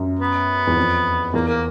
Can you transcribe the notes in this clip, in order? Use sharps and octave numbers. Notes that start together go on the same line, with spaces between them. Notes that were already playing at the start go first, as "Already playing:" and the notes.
Already playing: F#2
B3
E2
F2
E2 A#3
A#3